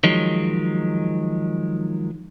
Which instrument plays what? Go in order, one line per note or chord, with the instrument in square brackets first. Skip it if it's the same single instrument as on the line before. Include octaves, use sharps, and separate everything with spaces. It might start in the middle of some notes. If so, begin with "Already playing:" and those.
[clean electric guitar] D#3 F3 F#3 G#3